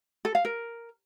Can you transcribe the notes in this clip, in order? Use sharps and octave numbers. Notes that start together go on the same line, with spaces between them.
A4
F5
A#4